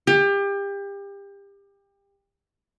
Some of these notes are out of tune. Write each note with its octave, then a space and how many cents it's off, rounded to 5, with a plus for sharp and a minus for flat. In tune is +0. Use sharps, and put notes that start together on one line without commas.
G4 +30